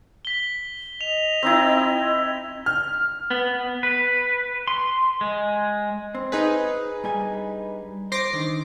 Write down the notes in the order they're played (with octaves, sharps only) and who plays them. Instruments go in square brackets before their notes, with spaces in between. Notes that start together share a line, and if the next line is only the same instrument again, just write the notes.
[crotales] B6 G7
[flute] D#5 [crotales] F7
[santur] C4 D#4 E4
[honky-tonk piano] F6
[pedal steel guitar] B3
B4
C6
G#3
[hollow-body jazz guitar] C4
[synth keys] D#4 G#4 B4
[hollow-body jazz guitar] G2 G3 G#5
[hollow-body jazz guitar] C5 [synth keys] D6 A#6 C7
[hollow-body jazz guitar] D3 D#3